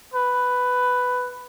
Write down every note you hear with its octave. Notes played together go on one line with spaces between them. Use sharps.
B4